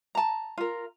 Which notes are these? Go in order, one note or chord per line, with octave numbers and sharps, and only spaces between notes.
A5 A#5
F4 A#4